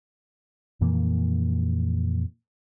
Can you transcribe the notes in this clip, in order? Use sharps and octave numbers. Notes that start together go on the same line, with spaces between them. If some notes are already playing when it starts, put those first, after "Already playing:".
F2 A#2 E3 A#3